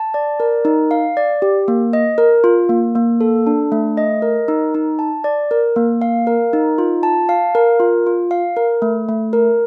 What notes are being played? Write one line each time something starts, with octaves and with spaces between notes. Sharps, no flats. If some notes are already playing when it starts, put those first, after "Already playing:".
Already playing: A5
D5
A#4
D#4
F5
D5
G4
A#3
D#5
A#4
F4
A#3
A#3
A4
D4
A3
D#5
A#4
D#4
D#4
A5
D5
A#4
A#3
F5
A#4
D#4
F4
A5
F5
A#4
F4
F4
F5
A#4
A3
A3
A#4